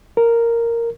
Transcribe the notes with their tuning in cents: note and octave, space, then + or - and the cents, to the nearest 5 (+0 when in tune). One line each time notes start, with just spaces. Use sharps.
A#4 -5